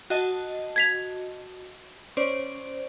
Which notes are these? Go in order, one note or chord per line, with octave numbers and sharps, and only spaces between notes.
F#4 D#5 A5
G#6 B6 F7
C#4 C5 D5